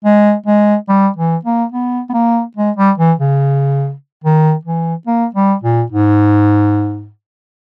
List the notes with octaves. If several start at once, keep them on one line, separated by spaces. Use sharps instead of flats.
G#3
G#3
G3
E3
A#3
B3
B3
A#3
G#3
G3
E3
C#3
D#3
E3
A#3
G3
A#2
G#2